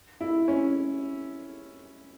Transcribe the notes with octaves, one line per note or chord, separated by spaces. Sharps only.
E4
C#4